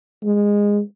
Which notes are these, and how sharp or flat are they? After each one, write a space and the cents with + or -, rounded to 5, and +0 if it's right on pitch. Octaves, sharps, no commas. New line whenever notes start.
G#3 -15